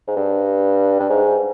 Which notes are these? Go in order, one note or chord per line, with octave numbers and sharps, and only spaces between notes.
G#2
G2
G2
G#2